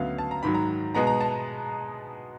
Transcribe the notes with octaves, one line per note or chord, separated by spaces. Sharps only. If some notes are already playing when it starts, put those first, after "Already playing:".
Already playing: D2 C#3 F#3 B3 F5
A5
A#5
G#2 D#3 F#3 B5
A#5
B2 G#3 B3 A#5
A#5
A5